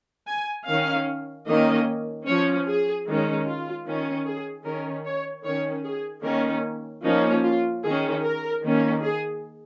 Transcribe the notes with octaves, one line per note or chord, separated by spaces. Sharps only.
G#5
D#3 C#4 F5
D#3 A#3 C#4 D#5
F3 C#4 C#5
G#4
D#3 G#3 C#4
F4
D#3 C#4
G#4
D#3 C#4 A#4
C#5
D#3 C#4 C#5
G#4
D#3 A#3 C#4 A#4
F3 A#3 C#4 D#4
F4
D#3 C#4 G#4
A#4
D#3 A#3 C#4
G#4